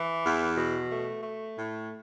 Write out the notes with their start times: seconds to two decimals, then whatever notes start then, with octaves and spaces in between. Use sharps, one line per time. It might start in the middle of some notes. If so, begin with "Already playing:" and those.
Already playing: E3
0.24 E2
0.57 B2
0.90 A3
1.23 A3
1.57 A2